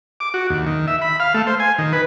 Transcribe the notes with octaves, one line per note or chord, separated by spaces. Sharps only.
D6
F#4
D#2
D#3
E5
B5
F5
A3
C5
G#5
D#3
B4